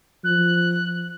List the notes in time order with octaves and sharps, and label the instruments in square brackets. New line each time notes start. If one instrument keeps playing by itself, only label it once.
[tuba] F3 [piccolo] F#6